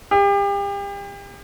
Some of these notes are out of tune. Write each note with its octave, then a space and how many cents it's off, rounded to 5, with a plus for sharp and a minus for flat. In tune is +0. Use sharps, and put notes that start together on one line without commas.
G4 +35